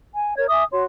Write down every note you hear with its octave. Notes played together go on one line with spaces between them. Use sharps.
G#5
A#4 C#5 G#6
E5 G#5 D6 D#6
F#4 C#5 C6